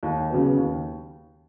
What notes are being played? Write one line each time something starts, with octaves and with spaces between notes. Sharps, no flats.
D#2
C#3 F#3 B3
D#2